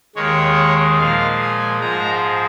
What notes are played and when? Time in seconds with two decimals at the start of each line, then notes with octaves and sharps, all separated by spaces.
0.16 D#2 D#3 G#3 C#5
0.98 A#2 F3 G#3 F5
1.40 G#5
1.81 G#2 F3 G#3 A#5